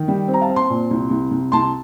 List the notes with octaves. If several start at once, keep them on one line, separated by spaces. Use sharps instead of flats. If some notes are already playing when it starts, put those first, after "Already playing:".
Already playing: D#3
G3
C4
A#5
F5 A5
C4
A5 C6
A#2
C2
C2
C2
C2 A5 C6